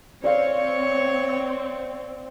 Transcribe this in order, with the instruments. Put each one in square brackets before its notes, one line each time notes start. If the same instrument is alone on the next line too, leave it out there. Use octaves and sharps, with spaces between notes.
[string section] C4 [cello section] C#5 [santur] D5 F5